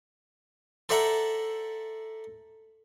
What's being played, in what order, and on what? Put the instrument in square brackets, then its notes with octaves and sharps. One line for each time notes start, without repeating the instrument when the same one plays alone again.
[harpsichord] A4 C5 D5 E5 F#5 A#5